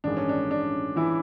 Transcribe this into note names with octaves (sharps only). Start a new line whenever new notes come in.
A1 G2 D#3 G#3 D4
C#4
D4
D4
E3 E4